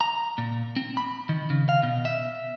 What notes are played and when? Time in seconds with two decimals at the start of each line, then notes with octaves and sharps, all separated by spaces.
0.01 A#5
0.38 A#2
0.76 C4
0.97 B5
1.29 D#3
1.50 C#3
1.69 F5
1.83 B2
2.05 E5